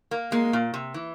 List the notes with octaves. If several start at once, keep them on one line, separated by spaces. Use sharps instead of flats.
A#3
G#3 A#3
A#2
C3
E3